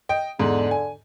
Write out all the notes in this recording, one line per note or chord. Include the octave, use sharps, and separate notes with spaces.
D#5 G5
E2 G#2 D3
G#5